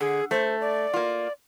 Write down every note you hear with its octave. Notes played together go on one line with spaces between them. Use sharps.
D3 G#4
A3 C5
D5
A#3 F4